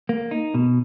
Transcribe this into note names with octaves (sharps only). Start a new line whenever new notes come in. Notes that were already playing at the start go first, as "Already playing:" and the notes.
A#3
D#4
B2